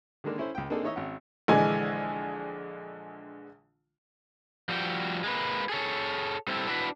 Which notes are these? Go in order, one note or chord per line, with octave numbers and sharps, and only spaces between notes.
D3 D#3 G#3 A#3 D4
C#4 E4 A4 C5
C#2 G5
A#3 C4 D4 D#4 G#4 A4
E3 D#4 C#5 D#5 E5
G#1 C#4 F#5
A#1 D3 E3 G#3 G#5
F3 G3 F#4 E5 G5
G#3 A#3 B4
G#4 A4 C#5
G3 C4 E4 A4
D4 E4 F#4 B4